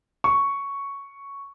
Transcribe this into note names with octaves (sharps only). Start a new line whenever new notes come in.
C#6